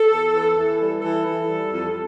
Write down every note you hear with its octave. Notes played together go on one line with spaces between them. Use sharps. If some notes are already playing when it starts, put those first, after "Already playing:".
Already playing: A4
E2
E3
E3
G3
E3 A4
E3
G3
F2